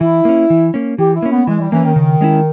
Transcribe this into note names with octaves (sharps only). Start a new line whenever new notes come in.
E3 E4
A#3 C#4
E3
A#3 C#4
E3 G4
E4
A#3 C#4
B3
E3 G#3
G3
E3 A#3 C#4
D#3
C#3
G#3 C#4 E4